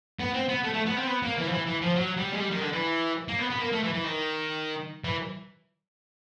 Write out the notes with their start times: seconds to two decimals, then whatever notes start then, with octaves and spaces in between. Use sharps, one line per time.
0.20 B3
0.34 C4
0.49 B3
0.63 A3
0.74 A3
0.86 B3
0.97 C4
1.07 B3
1.23 A#3
1.37 E3
1.47 F3
1.51 E3
1.66 E3
1.81 F3
1.95 F#3
2.17 G3
2.34 G#3
2.40 G3
2.51 D#3
2.61 D3
2.73 E3
3.28 A#3
3.39 B3
3.50 B3
3.60 A#3
3.72 A3
3.84 E3
3.94 E3
4.04 D#3
5.04 E3